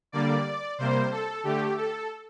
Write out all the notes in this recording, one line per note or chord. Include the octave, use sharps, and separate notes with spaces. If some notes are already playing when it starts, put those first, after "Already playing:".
D3 G3 A#3 D5
C3 G3 A#3 C5
A4
D3 A3 G4
A4